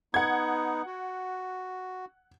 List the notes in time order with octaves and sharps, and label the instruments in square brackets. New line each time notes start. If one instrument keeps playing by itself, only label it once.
[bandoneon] B3 D#4 [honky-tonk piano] F#5 G#6
[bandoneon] F#4